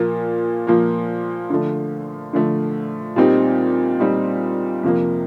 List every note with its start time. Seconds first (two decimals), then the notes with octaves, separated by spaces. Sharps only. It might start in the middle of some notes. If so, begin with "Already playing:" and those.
Already playing: A#2 F3 A#3
0.67 A#2 F3 A#3
1.50 D3 F3 A3
2.33 D3 F3 A3
3.16 A#2 G3 C4 D#4 G4
4.00 A#2 G3 C4 D#4 G4
4.83 F2 C3 F3 A#3